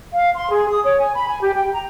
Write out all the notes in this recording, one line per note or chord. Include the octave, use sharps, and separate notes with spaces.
F5
C6
G#4
D#6
C#5
G#5
B5
G#5
G4
G5
A#5